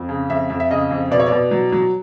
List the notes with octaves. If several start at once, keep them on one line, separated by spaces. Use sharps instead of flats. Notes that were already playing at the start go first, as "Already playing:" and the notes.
Already playing: F2
C#3
F2 E5
F2
E5
C#3 D#5
F2
B2 D5
C#5
D5
B2
F#3
F#3